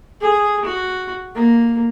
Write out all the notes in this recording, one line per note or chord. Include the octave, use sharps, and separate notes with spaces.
G#4
F#4
A#3